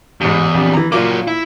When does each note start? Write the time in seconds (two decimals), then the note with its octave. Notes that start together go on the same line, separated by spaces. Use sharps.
0.21 A1 E2 G#2
0.54 A#1 F2 G4
0.73 E3 A#5
0.92 A#2 F#3 A#3 F4 D6
1.28 E4